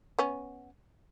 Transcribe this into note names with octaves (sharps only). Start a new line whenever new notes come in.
B3 C#4